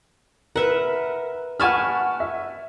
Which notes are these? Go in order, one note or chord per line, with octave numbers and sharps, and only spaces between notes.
A#4 B4 E5 F#5
F#5 G#5 A5 B5 C#6 F6
E5